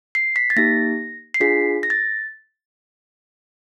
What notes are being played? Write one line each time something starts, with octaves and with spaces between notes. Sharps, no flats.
C7
B6
A6
A#3 D#4 G4 A#6
C7
D4 F4 G#4 B6
A#6
A6